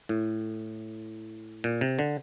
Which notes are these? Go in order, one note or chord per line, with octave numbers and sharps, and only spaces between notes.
A2
A#2
C3
D3